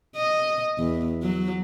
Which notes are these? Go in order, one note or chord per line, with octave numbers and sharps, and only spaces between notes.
D#5
E2
F#3